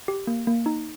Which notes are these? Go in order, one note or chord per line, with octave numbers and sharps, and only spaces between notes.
G4
A#3
A#3
D#4